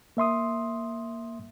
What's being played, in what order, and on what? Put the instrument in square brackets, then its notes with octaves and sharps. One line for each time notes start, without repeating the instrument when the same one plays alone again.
[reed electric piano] A#3 E5 C6 D#6